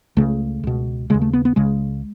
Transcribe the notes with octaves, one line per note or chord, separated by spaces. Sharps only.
C#2 C#3 A3
C#2 B2
D#2 C#3 G#3
A3
B3
B3
C#2 C#3 G#3